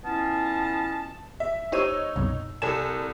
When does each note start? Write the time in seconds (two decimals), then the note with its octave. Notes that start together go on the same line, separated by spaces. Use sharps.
0.03 B3 C#4 E4 F4 D#5 A5
1.40 E5
1.72 D#4 G4 C5 C#5 E6 D#7
2.16 C2 F#2 B2
2.62 C2 A4 G#5 E7